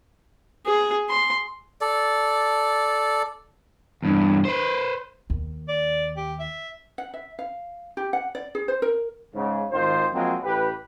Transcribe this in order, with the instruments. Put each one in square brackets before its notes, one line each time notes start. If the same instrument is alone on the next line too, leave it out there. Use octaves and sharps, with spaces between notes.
[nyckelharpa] G#4
C6
[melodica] A4 D5
[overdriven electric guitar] E2 G2
B4 C5
[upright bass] D#2
[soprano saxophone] D5
G4
E5
[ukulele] F#5
E5
F5
G4
F#5
D5
G#4
C5
A#4
[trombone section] G#2 C#3
G#1 D#3 F4 C5
F3 F#3 G#3 A#3 C4
A1 G4 B4